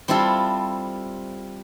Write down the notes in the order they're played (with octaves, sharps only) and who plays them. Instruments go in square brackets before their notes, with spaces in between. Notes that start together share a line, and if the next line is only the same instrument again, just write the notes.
[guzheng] G3 C4 E4 F4 A4